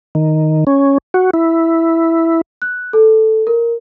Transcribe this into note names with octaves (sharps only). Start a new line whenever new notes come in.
D#3
C#4
F#4
E4
F#6
A4
A#4